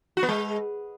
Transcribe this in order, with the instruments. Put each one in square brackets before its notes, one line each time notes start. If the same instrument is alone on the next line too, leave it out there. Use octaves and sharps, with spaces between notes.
[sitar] F#4
B3
G#3